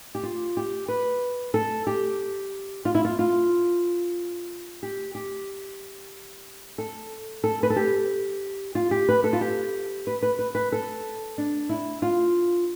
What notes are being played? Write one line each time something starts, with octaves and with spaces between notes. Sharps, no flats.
G4
F4
G4
B4
A4
G4
F4
E4
F4
F4
G4
G4
A4
A4
B4
A4
G4
F4
G4
B4
A4
F4
G4
B4
B4
B4
B4
A4
D4
E4
F4